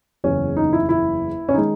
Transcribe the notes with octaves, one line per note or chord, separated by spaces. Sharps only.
F#1 E2 C#3 C#4
D#4
E4
E4
C#4
D#3 G#3 D#4